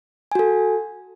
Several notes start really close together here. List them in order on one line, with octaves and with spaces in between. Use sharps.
G#5 F#4 A4